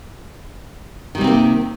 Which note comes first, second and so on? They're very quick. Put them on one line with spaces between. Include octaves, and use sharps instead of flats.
D#3 G3 C3 C4 A#3